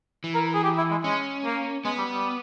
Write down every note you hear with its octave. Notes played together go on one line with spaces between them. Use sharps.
E3
A#4
G#4
G4
E4
G#3
G#3 C#4
A#3
G#3 B3
G3
G3